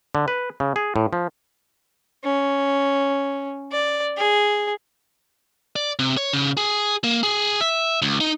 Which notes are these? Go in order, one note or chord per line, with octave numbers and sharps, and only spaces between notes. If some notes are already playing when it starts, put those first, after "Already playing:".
D3
B4
C#3
G#4
A2
F3
C#4
D5
G#4
D5
C3
C#5
C#3
G#4
A#3
G#4
E5
C#2
D#4